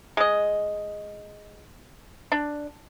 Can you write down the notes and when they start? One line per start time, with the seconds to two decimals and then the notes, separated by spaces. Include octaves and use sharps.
0.17 G#3 D#5
2.32 D4